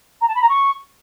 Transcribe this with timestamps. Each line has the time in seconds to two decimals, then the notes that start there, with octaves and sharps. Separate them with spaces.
0.21 A#5
0.28 A5
0.35 B5
0.42 A#5
0.49 C#6